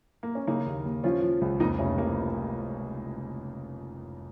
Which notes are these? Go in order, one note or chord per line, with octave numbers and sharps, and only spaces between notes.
A#3
C#4
C#3 A#3 D#4
D#2
D#2
F3 C#4 F4
F3
C#2
F2 A#3 D#4
F1 C#4
F1 A#3